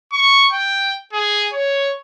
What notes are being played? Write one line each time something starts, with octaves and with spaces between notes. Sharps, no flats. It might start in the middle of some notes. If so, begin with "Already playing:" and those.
C#6
G5
G#4
C#5